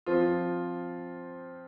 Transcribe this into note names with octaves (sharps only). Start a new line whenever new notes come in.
F3 C4 F4